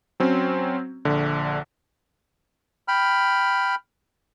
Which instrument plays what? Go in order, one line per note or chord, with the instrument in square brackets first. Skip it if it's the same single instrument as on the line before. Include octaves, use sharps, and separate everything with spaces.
[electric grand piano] F#3 C4 C#4
A#1 D3
[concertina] G5 B5 F6